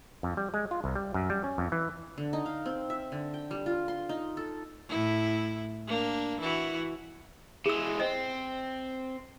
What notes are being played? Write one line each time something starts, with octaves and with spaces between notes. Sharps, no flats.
F2
G3
G#3
F4
C2
G3
F#2
G3
C#4
F2
E3
D3
D#4
F5
C4
E5
D3
G5
G3
F4
C6
D#4
A4
A2 E4
A#3 D4
E3 E4 F#4
E3 G#3 G#4 E6
C4 C5 D#5